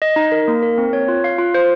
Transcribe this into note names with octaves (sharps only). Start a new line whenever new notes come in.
D#5
D#4
A#4
A#3
A#4
C4
C#5
F4
F5
F4
C5